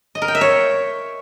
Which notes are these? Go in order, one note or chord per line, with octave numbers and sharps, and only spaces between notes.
D#5
A#4
G5
E5
C#5